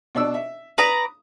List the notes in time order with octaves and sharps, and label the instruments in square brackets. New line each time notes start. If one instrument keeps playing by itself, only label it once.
[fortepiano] B2 D4 E6
E5
[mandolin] B4 D5 A#5 [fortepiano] D#6